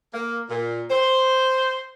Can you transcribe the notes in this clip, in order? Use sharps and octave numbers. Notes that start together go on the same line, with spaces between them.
A#3
A#2
C5